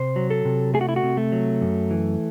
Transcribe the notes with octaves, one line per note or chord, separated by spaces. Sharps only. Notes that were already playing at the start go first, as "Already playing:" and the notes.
Already playing: C3 C5
F#3
A4
C3
A3 G#4
F#4
E4
F#4
C3
A3
F#3
F#2
E3